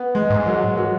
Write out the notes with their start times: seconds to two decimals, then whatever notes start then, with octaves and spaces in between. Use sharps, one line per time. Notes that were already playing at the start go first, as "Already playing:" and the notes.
Already playing: B3
0.15 G#3
0.30 G#2
0.46 F#3
0.77 F#3